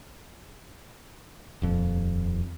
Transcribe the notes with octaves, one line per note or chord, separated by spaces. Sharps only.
D#1 F2